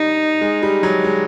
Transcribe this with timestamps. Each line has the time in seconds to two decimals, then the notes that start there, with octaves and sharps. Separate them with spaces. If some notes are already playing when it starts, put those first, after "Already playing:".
Already playing: G3 D#4
0.41 G#3
0.63 G3
0.83 F#3
1.04 G#3